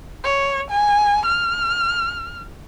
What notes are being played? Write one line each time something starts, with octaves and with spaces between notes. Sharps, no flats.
C#5
G#5
F6